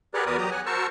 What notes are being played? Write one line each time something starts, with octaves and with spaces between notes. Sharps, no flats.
G4 G#4 A#4 B4 D5 F#5
E2 F#4 A#4 B4 D5 D#6
F#3 G4 A#5 D#6
F#5 G#5
F#4 A#4 C5 A5 C#6 E6